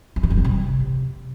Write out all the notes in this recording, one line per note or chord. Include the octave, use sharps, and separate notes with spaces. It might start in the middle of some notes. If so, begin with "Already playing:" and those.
E3
D#3
G2
F2
C3